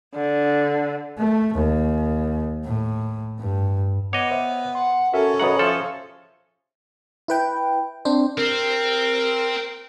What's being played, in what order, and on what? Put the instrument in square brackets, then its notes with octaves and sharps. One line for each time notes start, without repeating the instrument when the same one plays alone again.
[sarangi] D3
[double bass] A3
D#2
A2
G2
[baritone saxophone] B3 [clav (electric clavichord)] C#5 D#5 [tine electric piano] D6
[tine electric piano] B4 C5 E5
[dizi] F#5 [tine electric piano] C6
[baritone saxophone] C#4 [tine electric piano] F#4 A#4 E5 [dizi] A4
[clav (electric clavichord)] B1 F#2 F#5 [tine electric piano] A#5 B5 D#6
[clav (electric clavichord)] F3 A4 [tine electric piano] C5 E5 [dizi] F5
[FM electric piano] E4 B4 G5
C4 D4 C5
[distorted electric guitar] C4 [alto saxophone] A#4